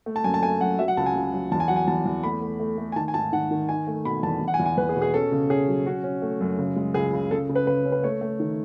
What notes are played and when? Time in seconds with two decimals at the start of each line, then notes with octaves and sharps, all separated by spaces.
0.06 A3
0.16 A5
0.24 F#2 G#5
0.34 A5
0.42 A3 G#5
0.61 F#2 F#5
0.79 F#3 E5
0.88 F#5
0.97 C#2 A5
1.06 G#5
1.15 C#2
1.34 F#3
1.52 E2 A5
1.60 G#5
1.68 F#3 F#5
1.76 G#5
1.88 E2 A5
2.06 E2
2.23 A3 B5
2.42 A3
2.60 A3
2.78 A3
2.92 G#5
2.96 D#3 A5
3.08 G#5
3.14 G#2 A5
3.33 D#3 F#5
3.51 D#3
3.69 D#4 G#5
3.87 A3
4.05 B2 B5
4.23 E2 A5
4.41 E2
4.48 F#5
4.54 G#5
4.60 E2
4.66 G#5
4.78 E2 B4
4.89 G#4
4.96 B2
5.02 G#4
5.14 C#4 A4
5.32 C#3
5.50 C#4 G#4
5.68 F#3
5.86 C#4 F#4
6.04 C#4
6.22 A3
6.41 F#2
6.58 C#3
6.76 G#3
6.94 C#2 G#4
7.13 C#3
7.31 C#3 A4
7.49 C#3
7.55 B4
7.67 C#3 B4
7.85 C#4
7.92 B4
8.03 A3 C#5
8.21 A3
8.40 D#3